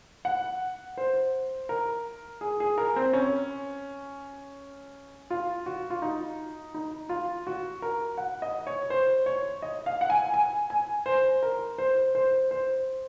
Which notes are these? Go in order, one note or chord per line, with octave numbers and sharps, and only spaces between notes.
F#5
C5
A#4
G#4
G#4
A#4
C4
C#4
F4
F#4
F4
D#4
D#4
F4
F#4
A#4
F#5
D#5
C#5
C5
C#5
D#5
F5
F#5
G#5
G#5
G#5
C5
A#4
C5
C5
C5